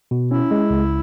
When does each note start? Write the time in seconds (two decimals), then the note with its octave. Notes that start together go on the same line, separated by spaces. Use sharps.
0.11 B2
0.31 C#4 E4
0.51 G#3
0.70 C#2